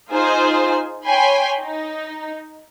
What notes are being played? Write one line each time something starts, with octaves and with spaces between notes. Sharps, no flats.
D#4 F4 G#4 C5 G#5
C#5 G5 G#5 B5 C6
D#4